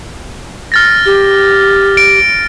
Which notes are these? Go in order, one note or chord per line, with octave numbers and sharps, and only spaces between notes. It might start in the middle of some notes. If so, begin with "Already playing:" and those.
F6 A6 A#6
G4
D7